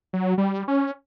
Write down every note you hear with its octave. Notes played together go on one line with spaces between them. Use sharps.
F#3
G3
C#4